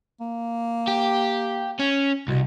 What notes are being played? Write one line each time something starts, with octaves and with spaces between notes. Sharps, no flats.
A#3
G4
C#4
C2 B2